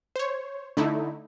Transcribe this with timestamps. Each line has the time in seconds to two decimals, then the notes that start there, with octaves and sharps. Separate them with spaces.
0.16 C5 C#5
0.77 D3 A3 D#4 E4